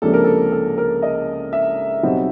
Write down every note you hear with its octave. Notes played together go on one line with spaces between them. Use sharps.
C#2 C3 F3 A#3 D4 A4
A#4
A4
A4
A#4
D#5
E5
B1 B2 G3 C4 D#4